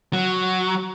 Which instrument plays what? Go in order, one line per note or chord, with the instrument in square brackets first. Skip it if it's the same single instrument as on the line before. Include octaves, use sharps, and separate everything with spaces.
[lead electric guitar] F#3